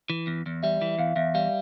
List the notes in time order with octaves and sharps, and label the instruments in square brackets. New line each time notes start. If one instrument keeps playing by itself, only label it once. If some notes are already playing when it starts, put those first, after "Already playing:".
[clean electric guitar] E3
E2
E2
[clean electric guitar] G3 [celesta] E5
[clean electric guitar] E3
[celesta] E5
[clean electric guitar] E2 [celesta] F5
[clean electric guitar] E2 [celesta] E5
[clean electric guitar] G3 [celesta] F5